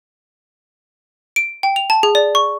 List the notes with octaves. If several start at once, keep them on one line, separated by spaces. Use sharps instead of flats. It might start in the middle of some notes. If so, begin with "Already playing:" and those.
D7
G5
F7
A5
G#4
D5
C#6